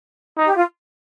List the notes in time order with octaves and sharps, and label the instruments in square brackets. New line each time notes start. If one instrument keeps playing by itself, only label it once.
[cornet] D#4
[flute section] G4
F4